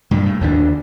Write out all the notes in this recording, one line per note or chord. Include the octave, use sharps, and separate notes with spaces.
G2 A#2
A2
D#2 D3 E3 D4